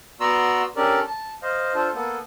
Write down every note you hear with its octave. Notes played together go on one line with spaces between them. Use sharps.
B3 F#4 D5 A#5 C6 E6
C#4 D4 G4 A4 A#4 D5
A5
C5 D#5 F5
D4 F4 A4 C5
A#3 B3 A4